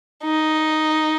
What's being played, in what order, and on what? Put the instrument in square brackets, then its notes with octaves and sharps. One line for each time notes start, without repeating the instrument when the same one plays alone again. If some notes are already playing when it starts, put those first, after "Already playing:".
[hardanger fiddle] D#4